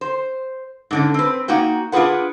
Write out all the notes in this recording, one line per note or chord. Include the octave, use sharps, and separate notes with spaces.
C5
G#2 D3 C#4
C4 B4
A#3 D#4 F#4 G5
D4 F4 F#4 G#4 B4 F#5